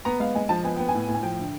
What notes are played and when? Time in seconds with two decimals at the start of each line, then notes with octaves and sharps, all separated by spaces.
0.05 B3 A#5
0.20 G#3 F5
0.35 G#3 G#5
0.49 F3 A5
0.64 B3 G#5
0.77 B3 G5
0.89 G#5
0.94 A2
1.08 A2
1.14 G#5
1.23 F3 G5
1.39 D3